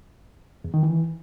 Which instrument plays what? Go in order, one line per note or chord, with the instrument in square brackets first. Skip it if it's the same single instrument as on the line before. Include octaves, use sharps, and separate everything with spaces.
[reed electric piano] E2
D#3
E3